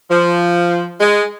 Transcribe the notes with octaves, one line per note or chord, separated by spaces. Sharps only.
F3
G#3